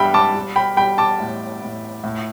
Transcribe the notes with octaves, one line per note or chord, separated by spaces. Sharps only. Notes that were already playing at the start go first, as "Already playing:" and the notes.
Already playing: G2 G3 E5 G5 B5
A5 D6
G3
G5 B5
G3 G5 B5
A5 D6
A2
A2
A2